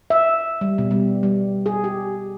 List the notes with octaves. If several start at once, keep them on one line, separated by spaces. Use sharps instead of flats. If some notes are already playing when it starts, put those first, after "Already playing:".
E5
G3
B2
G3
G3
G#4
G4